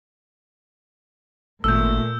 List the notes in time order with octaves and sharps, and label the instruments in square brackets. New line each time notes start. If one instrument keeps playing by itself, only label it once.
[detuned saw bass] G#1 [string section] A#2 [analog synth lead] A3 [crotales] E6 G6